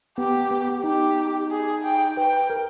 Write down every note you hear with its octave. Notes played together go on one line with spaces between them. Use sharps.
B3 G4
B3
D#4 G4
G#4
G5
B4 G5
A#4